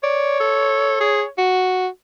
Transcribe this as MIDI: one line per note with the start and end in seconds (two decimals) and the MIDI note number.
0.03 1.28 73
0.03 0.39 74
0.40 0.98 69
1.00 1.23 68
1.38 1.87 66